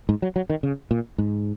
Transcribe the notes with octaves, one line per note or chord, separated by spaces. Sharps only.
G#2
F#3
F#3
D#3
C#3
A#2
G#2